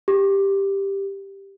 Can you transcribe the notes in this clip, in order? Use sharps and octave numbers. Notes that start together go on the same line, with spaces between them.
G4